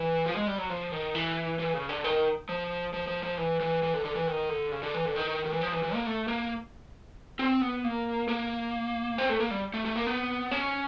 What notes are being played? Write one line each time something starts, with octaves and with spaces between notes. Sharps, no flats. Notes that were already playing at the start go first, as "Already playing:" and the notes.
Already playing: E3
F3
G#3
G3
F#3
F3
D#3
E3
E3
C#3
D3
D#3
F3
F3
F3
F3
E3
E3
E3
D3
D3
E3
D#3
D3
C#3
D3
E3
D3
D#3
D#3
E3
F3
E3
E3
A#3
A3
A#3
C4
B3
A#3
A#3
C4
A3
A#3
G3
A3
A3
A#3
B3
C#4